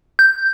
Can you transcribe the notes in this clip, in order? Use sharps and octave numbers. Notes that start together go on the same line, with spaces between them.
G6